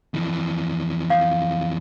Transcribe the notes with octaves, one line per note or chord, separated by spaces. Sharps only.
F2 E3
F5